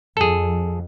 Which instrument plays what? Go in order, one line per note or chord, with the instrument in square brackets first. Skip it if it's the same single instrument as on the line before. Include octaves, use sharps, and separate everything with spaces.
[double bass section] F2 [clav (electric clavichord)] G#4 A4